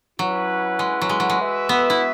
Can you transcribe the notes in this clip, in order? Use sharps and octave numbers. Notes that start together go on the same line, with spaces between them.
F#3 C#4 E4 B4 F#5
G#3
F#3
G#3
F#3
G#3
F#4 B4 E5
B3
E4